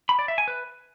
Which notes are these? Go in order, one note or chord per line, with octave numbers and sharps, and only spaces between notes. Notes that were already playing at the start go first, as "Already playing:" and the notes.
B5
D5
E5
G#5
B4